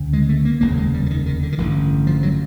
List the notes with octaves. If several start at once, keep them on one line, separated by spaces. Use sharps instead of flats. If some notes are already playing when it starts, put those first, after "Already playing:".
Already playing: D2 C#3
G#3
A3
A#3
F1 D#2 C#3 A#3
G#3
G3
D3
D#3
D#3
D3
D#3
A1 G2 D3 E3
F3
F#3